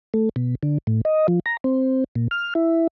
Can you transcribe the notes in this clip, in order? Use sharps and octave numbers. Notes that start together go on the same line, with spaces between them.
A3
B2
D3
A2
D#5
F3
A#5
C4
A#2
F6
E4